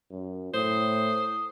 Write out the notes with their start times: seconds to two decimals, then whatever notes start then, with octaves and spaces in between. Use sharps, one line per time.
0.11 F#2
0.54 A2 C5 D#6